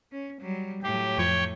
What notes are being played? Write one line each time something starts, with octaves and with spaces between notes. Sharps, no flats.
C#4
F#3 G3
A2 F#3 G4
F2 F3 C#5 G5 G#6